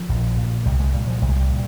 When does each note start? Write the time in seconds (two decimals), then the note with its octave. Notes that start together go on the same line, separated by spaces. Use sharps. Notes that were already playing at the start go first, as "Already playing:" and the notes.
Already playing: F3
0.09 A#1
0.38 A#2
0.66 C2 G3
0.80 G#3
0.94 A#2 G3
1.08 F3
1.22 C2 G3
1.29 G#3
1.36 G3
1.50 A#2